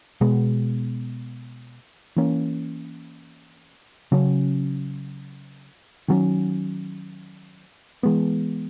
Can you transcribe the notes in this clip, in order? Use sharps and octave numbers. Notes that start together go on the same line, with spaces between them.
B2 G#3 B3
E3 A#3 C#4
C#3 F#3 C#4
D#3 F#3 A#3 C#4
E3 G#3 B3